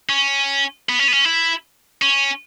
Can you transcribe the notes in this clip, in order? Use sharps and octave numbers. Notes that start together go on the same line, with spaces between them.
C#4
B3
C#4
B3
C#4
E4
C#4